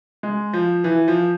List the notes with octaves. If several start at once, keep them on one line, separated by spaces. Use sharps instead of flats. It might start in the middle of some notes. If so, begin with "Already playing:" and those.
G#3
F3
E3
F3